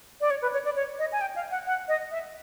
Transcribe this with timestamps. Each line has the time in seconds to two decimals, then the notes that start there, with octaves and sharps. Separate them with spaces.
0.21 D5
0.31 C#5
0.42 B4
0.53 C#5
0.65 D5
0.76 C#5
0.99 D#5
1.12 G#5
1.21 G5
1.36 F5
1.51 F#5
1.66 F#5
1.88 D#5
2.11 E5